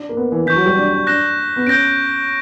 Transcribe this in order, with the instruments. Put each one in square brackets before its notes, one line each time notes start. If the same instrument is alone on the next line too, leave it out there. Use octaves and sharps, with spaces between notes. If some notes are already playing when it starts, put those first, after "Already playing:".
Already playing: [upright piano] D4
A#3
B3
E3
[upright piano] E3 [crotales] C#6 G6 B6
[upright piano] F#3
G3
D4
D4
[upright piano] D4 [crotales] F#6 A#6 E7
[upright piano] B3
[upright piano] C#4 [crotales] G6 A#6 D7